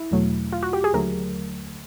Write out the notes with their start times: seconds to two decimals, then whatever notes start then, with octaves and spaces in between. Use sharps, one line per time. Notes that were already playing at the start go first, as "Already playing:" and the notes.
Already playing: E4
0.11 E2 B2 F#3 A3
0.53 F4
0.63 F#4
0.73 G4
0.84 G#4
0.93 D#2 D3 F#3 A3 A#4